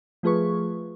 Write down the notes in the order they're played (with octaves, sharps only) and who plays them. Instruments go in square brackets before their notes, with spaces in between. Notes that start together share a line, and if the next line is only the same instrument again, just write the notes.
[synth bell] F3 A3 F4 G#4 B4 C#6